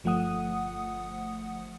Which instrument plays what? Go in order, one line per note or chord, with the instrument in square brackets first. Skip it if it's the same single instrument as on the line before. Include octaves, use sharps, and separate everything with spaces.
[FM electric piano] G1 F3 A3 F#5 D#6